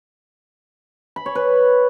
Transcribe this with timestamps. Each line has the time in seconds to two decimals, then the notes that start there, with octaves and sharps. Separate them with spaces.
1.16 B5
1.26 C#5
1.35 B4